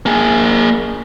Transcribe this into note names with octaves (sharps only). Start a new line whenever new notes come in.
A#3 G#4